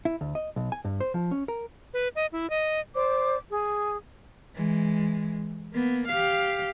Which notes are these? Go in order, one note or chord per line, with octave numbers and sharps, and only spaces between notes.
E4
D2
D#5
B1
G#5
G2
C5
F3
C#4
A#4
B4
D#5
E4
D#5
C5 D5 D6
G#4
E3 G#3
A#3 B3
G4 F5